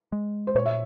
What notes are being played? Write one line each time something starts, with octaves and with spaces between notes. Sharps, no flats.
G#3
C5
A#2 C#5
E5